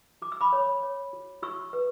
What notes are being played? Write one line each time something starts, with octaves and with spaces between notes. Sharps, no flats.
F#4 D6
E6
B5 D6
C#5
C#5
F#4
F#4 C#6 E6
B4